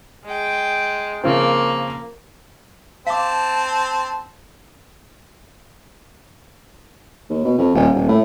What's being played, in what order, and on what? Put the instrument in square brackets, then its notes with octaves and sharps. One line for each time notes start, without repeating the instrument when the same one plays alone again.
[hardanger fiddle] G#3 G5
[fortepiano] C#3 F3 C4 [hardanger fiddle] A#3
[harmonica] C4 [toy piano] F5 D6 [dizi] A5
[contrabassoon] D#2
B2
F2
D#1
D#1
A2